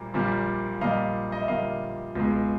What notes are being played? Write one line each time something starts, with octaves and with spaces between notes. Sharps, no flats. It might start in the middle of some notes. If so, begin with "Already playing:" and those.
Already playing: A#1 A#2 G3 A#3
A#1 A#2 G3 A#3
A#1 A#2 G3 A#3 D#5 F5
D#5
E5
A#1 A#2 G3 A#3 D#5 F5
C#2 B2 G#3